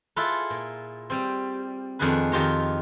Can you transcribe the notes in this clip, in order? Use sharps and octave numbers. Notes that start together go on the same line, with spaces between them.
E4 F4 G#4 A4 B4
A#2
G3 C4
F2 D#3 D4 G#4 B4
F2 D#3 F4 G4 C#5 A#5